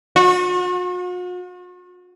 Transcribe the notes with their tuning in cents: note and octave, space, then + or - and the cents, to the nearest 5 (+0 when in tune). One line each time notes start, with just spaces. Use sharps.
F#4 -45